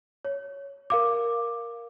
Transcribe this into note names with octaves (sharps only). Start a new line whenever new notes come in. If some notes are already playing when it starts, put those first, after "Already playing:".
C#5
A#4 F5 D6